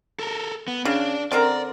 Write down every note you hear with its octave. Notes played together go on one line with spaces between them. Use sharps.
A4 A#4
B3
C#3 D4
D3 C4 A#4 D5